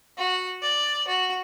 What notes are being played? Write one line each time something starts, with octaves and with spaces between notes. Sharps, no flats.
F#4
D5
F#4